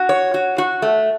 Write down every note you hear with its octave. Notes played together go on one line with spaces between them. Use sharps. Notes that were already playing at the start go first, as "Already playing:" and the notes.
Already playing: F#4
C#5
F#4
F#4
A3